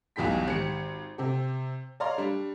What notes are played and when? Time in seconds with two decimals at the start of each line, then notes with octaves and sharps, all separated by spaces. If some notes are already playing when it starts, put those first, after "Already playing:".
0.16 B1 E2 B2 G3 G5 B6
0.48 G#1 G4 C#7
1.18 C3 G4
2.00 C#5 D5 F5 A#5 C6
2.18 G3 D4